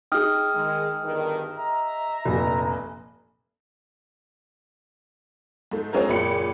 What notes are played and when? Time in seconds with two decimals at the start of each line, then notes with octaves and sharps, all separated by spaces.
0.12 D#4 G#4 G5 D#6 F6
0.54 D#3 G#3
1.04 G1 G2 D#3
1.57 D#5 E5 A#5
2.25 F1 A#1
5.71 G#2 A3
5.93 G#3 C4 C#4 F4 G#4 A#4
6.08 F#1 A#2 G#4 G5 B5 C#7